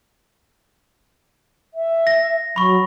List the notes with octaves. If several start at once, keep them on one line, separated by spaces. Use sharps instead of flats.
E5
A#6
F#3 B5 C#6